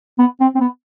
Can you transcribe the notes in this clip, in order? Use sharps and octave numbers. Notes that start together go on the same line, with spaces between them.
B3
C4
C4
B3